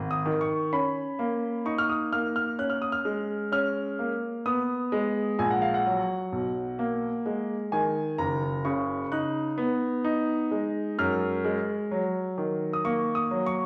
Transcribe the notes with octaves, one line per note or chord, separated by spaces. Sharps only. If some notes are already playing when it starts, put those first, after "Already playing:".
Already playing: G#1
D#6
D#3
C#6
C#4 B5
A#3
D#4 C#6
F6
D#6
A#3 F6
F6
C#4 F#6
F6
D#6
F6
G#3
C#4 F6
A#3
B3 D#6
G#3
A#1 G#5
F#5
F5
F#5
F#3
B1
A#3
G#3
D#3 G#5
F#1 A#5
C#3 C#6
D#4 F#6
B3
D#4
G#3
F#2 F6
G#3
F#3
D#3
D#6
A#3 C#6
D#6
F#3
C#6